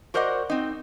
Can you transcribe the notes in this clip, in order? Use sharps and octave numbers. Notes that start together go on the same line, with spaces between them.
F#4 A#4 C5 D5 D#5 F#5
C4 D#4